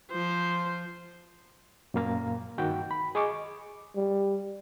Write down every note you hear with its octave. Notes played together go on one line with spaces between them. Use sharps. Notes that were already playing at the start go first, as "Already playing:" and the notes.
F3 C5
F#2 A#2 A#3 F5 A#5
G2 D#3 F#4 G5
B5
G#4 D#5 C#6 D6
G3